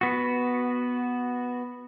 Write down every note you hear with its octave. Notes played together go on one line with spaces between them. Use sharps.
B3 F#4